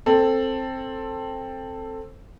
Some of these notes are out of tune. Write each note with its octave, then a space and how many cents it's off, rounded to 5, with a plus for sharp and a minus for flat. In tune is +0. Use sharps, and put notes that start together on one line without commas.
C4 +10 A4 +10